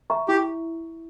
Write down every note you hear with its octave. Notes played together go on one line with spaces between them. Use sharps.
E5 A#5 C#6
E4 G4